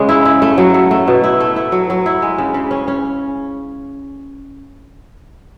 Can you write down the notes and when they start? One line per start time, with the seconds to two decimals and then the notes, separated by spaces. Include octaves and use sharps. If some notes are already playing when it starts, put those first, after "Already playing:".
Already playing: C#3 G#3 C#4
0.09 E4
0.25 E4
0.42 A3
0.58 F#3
0.74 A3
0.91 A3
1.08 B2
1.24 E4
1.40 A3
1.56 E4
1.72 F#3
1.90 F#3
2.06 E4
2.22 G#3
2.38 C#3
2.54 C#3
2.71 C#4
2.88 C#4